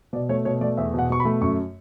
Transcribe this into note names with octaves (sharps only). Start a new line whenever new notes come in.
B2 D5
A3 C#5
B2 C#5
A3 D5
E2 E5
B2 F#5
B2 C#6
B5
A3
F#2 C#6